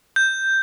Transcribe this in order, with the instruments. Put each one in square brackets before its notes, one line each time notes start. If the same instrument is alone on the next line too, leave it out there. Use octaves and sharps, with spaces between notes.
[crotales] G6